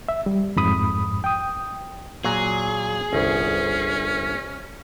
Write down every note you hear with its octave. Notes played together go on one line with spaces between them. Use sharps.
E5
G3
F2 G#2 B5 D#6
G5 D#6
A#2 F#3 G#4 A#5
G1 C2 C#4